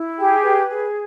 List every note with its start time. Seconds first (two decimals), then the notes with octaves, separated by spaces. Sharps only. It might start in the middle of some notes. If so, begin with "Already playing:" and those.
Already playing: E4
0.17 G4 G#4 G5
0.43 B4
0.68 G#4